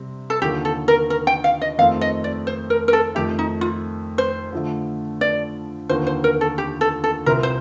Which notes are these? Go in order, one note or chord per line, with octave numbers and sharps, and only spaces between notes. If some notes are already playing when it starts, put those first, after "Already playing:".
Already playing: C3 G3 C4
A4
D#2 D3 F3 A#3 G4
A4
A#4
A#4
G5
F5
D#5
F2 D#3 A3 C4 F5
D#5
D5
C5
A#4
A#4
A4
F2 D#3 A3 G4
D#4
F4
C5
D3 F3 A3
D5
D#2 D3 F3 A#3 C5
C5
A#4
A4
G4
A4
A4
C2 C3 F3 C4 A#4
C5